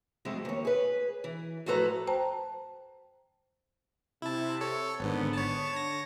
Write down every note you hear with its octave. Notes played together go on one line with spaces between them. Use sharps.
F2 G#3 A3 F#4
D#2 C#5
G#4 B4
E3
A2 F3 F#4 A4 B4 A#5
C5 G5 A5 A#5
C3 E4 A5
A4 C#5
G#1 G#2 D3 B3
C#5 A5
D3 C#5 A#6